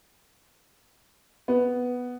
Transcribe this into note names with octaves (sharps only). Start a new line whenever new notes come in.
B3